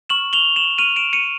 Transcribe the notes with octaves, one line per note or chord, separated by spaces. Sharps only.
C#6 F6 E7 F#7
F7 G7
E7 F#7
C#6 F6 D#7 F7
D7 E7
C#7 D#7